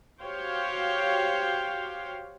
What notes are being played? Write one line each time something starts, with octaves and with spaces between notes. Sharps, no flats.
F#4 G4 C5 C#5 F5 G5